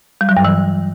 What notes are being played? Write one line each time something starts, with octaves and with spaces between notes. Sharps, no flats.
G3
F#3
G2
E3